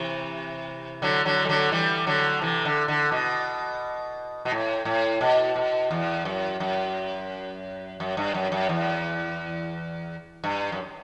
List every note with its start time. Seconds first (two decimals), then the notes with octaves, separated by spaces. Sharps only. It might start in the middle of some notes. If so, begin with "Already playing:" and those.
Already playing: C3 E3
1.02 D3 F#3
1.25 D3 F#3
1.45 G3
1.49 D3 F#3
1.72 E3 G3
2.07 D3 F#3
2.41 C3 E3
2.65 D3
2.88 D3
3.12 B2
4.45 B2
4.51 A2
4.85 A2
5.21 B2
5.56 B2
5.91 E2
6.25 F#2
6.60 F#2
8.00 F#2
8.17 G2
8.34 F#2
8.52 F#2
8.69 E2
10.44 G2
10.72 F#2